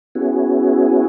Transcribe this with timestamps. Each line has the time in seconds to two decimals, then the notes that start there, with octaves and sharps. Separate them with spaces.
0.15 B3 C#4 E4 F#4 G#4